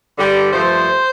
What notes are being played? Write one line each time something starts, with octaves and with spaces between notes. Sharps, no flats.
G2 D3 G3
G2 F3 A3 C5